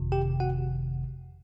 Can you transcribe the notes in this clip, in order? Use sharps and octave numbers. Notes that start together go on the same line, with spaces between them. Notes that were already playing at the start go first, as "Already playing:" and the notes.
Already playing: G1 F2 C3 D#3
G4 G5
F#4 F#5